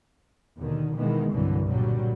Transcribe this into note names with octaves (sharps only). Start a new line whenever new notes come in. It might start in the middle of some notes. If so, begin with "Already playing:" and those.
D#2 B2 D3 D#3
B2 D#3 E3 G#3 B3
C2 G2 B2 D3 E3 F#3
A#2 D3 F#3 G3